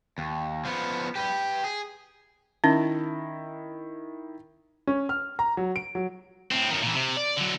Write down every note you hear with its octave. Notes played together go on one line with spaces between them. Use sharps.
D#2
F3 B3
G4 B4
G#4
D#3 C#4 E4 A#6
C#4
F6
A#5
F#3
D7
F#3
A2 C4
F#2 D#3
A#2 E3
C3
D5
D3 F#3